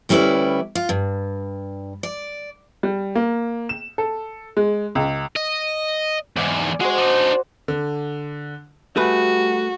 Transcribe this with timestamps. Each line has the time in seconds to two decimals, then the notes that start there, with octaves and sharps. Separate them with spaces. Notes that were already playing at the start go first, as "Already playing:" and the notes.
0.09 D2 G3 C#4 E4 B4 D5
0.75 F4
0.89 G2
2.03 D5
2.83 G3
3.15 A#3
3.69 E7
3.98 A4
4.57 G#3
4.95 C#2
5.36 D#5
6.37 E2 G#2 D5 G#5
6.80 G#3 F#4 C5
6.98 D4 D#4
7.68 D3
8.96 G3 A3 F#4 G#4 B4